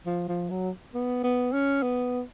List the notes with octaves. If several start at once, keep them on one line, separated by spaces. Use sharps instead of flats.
F3
F3
F#3
B3
B3
C#4
B3